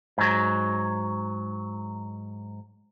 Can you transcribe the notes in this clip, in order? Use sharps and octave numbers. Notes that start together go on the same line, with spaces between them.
G#2 F#3